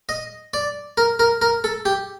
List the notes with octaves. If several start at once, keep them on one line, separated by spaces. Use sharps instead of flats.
D#5
D5
A#4
A#4
A#4
A4
G4